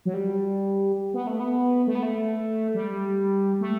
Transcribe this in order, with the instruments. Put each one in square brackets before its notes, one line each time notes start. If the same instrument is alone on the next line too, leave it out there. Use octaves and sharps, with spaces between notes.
[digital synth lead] F#3
G3
B3
A3
B3
A3
B3
A3
G3
A3